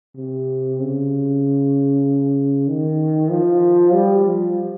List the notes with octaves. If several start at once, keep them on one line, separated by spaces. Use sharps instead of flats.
C3
C#3
D#3
F3
G3
F3